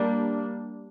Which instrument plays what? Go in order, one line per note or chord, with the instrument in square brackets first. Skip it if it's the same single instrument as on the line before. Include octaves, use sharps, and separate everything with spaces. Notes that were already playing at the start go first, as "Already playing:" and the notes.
Already playing: [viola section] G3 A#3 D4